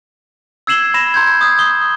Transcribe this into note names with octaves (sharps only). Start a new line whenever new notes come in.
E6 G#6 C7 E7 F#7 G7
B5 A#6 E7
A#5 C6 G6 G#6
D#6 G6 G#6
D#6 G7